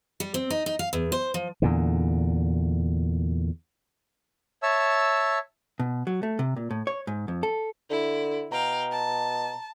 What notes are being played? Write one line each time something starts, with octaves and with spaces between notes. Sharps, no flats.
G3
C4
D#4
D#4
F5
E2
C5
F3
E2 A#2 D3
C#5 E5 A5 E6
B2
F#3
A3
C3
A#2
A2
C#5
G#2
F2
A4
D3 E4
B2 F5 G5 A#5
A5